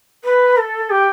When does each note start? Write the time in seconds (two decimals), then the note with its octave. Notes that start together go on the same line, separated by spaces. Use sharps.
0.24 B4
0.57 A4
0.90 G4